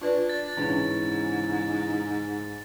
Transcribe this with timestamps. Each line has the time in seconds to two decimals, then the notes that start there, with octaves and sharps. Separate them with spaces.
0.02 D4 F4 B4 D5
0.29 A6
0.57 G#2 C#3 E3 D4